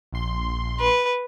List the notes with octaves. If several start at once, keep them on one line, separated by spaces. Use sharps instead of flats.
A#1 C6
B4